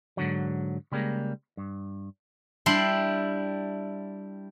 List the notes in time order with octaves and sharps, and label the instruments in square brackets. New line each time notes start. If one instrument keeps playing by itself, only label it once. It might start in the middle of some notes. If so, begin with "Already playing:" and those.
[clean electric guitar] G#2 D3 F#3
C#3 G3 G#3 A#3
G2
[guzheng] G3 D4 E4 C6